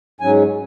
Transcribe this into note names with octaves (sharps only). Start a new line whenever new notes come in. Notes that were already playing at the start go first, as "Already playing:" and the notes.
G#2 F#3 C#4 G#5